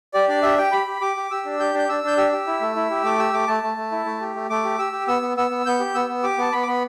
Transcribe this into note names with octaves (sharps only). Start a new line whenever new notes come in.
G4 D5
D4 D5
G4 E5
G4 G5
G4 B5
G4
G4 D6
G4
G4 E6
D4
G4 G6
D4 G6
D4 E6
D4 G6
G4 E6
G4
E4
A3
E4
G4
A3 D6
G4 E6
A3 D6
A3 A5
A3
A3
E4
A3
G4
A3
A3 D6
G4
G4 E6
G4
B3 E6
B3
B3 E6
B3
B3 G6
G4
B3 E6
B3
G4 D6
B3 A5
B3 B5
D6
B3 B5